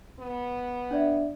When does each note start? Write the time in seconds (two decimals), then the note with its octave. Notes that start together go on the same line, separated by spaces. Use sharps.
0.20 B3
0.91 D4 D5 E5